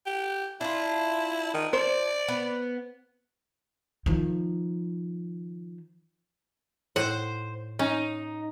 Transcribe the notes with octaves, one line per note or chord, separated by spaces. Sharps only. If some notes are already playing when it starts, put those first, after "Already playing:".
G4
D4 E4 F4
D#3
C5 D5
B3
D#3 F3
A2 C5 F#5
C#4 D#4